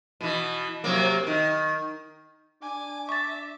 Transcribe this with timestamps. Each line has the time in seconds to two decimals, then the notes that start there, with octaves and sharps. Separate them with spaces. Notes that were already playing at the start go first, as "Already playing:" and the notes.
0.21 B2 E3
0.84 C3 F#3 A#3
1.27 D#3
2.62 D4 G#5 D6
3.09 E5 C#6 A6